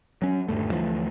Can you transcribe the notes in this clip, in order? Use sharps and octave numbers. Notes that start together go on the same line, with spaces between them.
F#3 C#4
D#1 D2 G2 A3
D2 E3 F3 A3